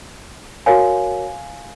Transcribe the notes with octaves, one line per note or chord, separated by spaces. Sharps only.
F#4 A#4 C#5 F5 G#5